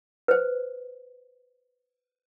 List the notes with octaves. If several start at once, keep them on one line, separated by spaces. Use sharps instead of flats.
B4 C5